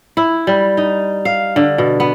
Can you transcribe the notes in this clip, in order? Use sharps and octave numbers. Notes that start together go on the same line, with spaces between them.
E4
G3
D#4
F5
D3
B2
B3